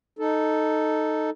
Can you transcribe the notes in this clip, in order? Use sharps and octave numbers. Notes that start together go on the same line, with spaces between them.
D#4 A4